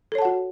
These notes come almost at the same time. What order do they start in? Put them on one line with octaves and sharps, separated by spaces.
A4 C#5 A5 F#5 F#4